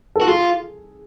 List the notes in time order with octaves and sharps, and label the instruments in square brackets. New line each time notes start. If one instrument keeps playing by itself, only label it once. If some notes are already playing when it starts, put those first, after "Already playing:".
[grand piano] A4
[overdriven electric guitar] F#4
[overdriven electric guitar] F4 [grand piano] G#4